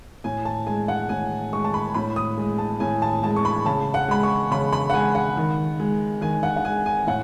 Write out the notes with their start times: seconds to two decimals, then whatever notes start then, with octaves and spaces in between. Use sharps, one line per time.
0.24 A2 G#5
0.45 A5
0.66 G#3 G#5
0.88 F#5
1.09 A2 G#5
1.53 G#3 C#6
1.64 A5
1.74 B5
1.94 A2 B5
2.16 D#6
2.37 G#3
2.58 A5
2.80 A2 G#5
3.02 A5
3.23 G#3 A5
3.36 C#6
3.45 B5
3.65 C#3 A5
3.94 F#5
4.08 G#3 B5
4.23 C#6
4.51 C#3 B5
4.73 B5
4.90 F#5
4.94 G#3 G#5
5.15 F#5
5.37 D#3
5.80 G#3
6.21 D#3 G#5
6.43 F#5
6.56 F#5
6.65 G#3 G#5
6.86 G#5
7.07 A2 F#5